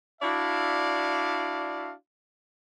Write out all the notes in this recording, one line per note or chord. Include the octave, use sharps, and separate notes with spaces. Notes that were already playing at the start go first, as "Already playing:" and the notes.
D4 E4 F#4 D5 E5 F5